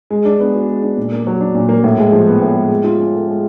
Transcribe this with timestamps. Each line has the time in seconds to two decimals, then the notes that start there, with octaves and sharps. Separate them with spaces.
0.10 G#3
0.25 D4
0.40 B3
0.54 F#4
0.69 G#3
0.83 D4
0.97 A#2
1.12 A#3
1.27 F#3
1.40 D4
1.55 A#2
1.69 A#3
1.84 A2
1.98 G#3
2.12 F3
2.27 B3
2.42 A2
2.56 G#3
2.71 G#3
2.84 F4
2.99 C#4
3.14 A4
3.28 G#3